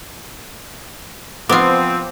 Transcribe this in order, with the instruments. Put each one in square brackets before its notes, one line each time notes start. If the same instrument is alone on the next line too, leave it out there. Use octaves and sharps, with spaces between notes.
[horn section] F3 C4 [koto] B3 F4 [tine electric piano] D6